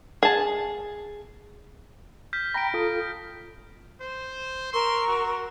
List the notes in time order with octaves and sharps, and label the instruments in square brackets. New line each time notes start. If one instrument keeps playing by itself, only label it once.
[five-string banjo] G#4 A5
[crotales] F6 G6 B6
[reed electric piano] G5 A#5 B5 [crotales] A#6 D7
[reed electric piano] F4 A4 D#6
[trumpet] C5
[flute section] A#4 C#6 E6 [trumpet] C6
[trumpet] F#4